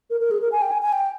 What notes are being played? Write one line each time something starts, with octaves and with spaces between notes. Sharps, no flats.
A#4
A#4
G#4
A#4
G#5
G5
G#5
G#5
G5